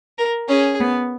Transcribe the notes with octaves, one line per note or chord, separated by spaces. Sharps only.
A#4
C#4 G#4
B3